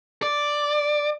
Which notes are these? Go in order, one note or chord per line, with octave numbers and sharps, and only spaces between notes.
D5